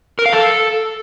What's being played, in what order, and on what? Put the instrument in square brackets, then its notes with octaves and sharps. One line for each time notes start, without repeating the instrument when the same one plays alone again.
[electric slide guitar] A#4
F5
A4